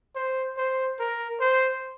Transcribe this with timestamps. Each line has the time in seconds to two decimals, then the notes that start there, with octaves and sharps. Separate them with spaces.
0.15 C5
0.57 C5
1.00 A#4
1.40 C5